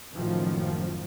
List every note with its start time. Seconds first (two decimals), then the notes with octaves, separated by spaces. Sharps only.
0.15 F#1 F#2 A2 D#3 F3